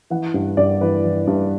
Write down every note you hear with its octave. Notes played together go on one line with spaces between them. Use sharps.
E3 F#5
G2
G2 D5
E3 B4
E3
G2